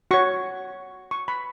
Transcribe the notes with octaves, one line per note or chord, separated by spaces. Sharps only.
F#4 C#5 C#6
C#6
B5